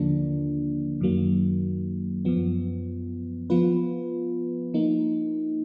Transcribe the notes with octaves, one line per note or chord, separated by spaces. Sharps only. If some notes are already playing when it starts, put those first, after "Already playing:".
Already playing: D#2 D3 F3 A#3 D4
F#2 D#3 F#3 A#3
F#2 F3 B3
F3 B3 F4 B4
F3 A#3 D#4